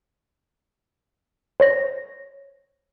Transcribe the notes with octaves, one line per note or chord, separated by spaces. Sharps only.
C5 C#5 A#6